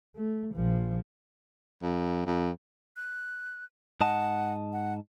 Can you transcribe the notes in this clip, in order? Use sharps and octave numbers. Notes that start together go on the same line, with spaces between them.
A3
A#1 F3
F2
F2
F#6
G#2 D#5 F#5 A5
F#5